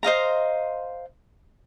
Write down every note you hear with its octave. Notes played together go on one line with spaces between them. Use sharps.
C5 D#5 F5 A#5